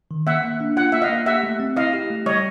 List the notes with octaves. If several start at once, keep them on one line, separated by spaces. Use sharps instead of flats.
D#3
A#3 E5 F#5
A#3
D4
F4 F#5
A#3 E5 F#5
D#5 F5
A#3
G4 E5 F#5
A3
C4
E4 D#5 F5
G4
A3
G3 C#5 D#5